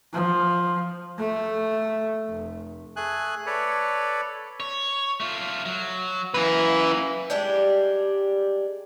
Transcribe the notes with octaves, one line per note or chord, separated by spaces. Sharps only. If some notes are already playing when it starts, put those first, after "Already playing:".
F3
A3
F1
A3 G#4 G#5 F#6
A4 B4 C#5 D5
C#5
A3 F4
F#3
F#2 A#3 E4 B4
G3 G#3 D4 G4